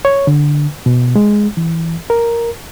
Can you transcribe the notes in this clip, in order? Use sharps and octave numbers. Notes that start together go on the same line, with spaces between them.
C#5
D3
B2
G#3
E3
A#4